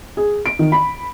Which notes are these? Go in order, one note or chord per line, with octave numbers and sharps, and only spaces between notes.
G#4
D7
D#3
B5